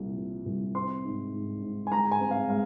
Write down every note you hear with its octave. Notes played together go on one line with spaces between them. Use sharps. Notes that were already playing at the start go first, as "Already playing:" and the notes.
Already playing: C2 A#2
F3
C2
C4 C6
G#2
G#2
G#2
G#5
G#3 A#5
G#5
C4
F5
G#3 F5